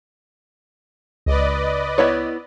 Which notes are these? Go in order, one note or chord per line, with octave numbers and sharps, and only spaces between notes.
C#2 B4 D5 D#5
B3 E4 C#5